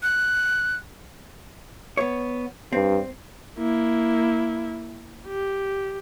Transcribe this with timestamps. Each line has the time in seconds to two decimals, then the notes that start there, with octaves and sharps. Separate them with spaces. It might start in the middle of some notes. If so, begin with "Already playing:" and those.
0.03 F#6
1.97 B3 C#5
2.73 G2 C4
3.58 A#3 E4
5.27 G4